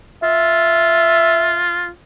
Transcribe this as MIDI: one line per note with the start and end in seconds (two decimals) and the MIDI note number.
0.23 1.89 65
0.23 1.62 76